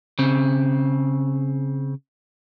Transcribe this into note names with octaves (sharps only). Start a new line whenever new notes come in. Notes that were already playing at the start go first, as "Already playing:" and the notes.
C#3 C4